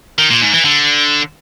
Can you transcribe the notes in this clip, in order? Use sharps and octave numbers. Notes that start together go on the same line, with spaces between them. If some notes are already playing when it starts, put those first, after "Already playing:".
D#3
A#2
G#2
E3
D3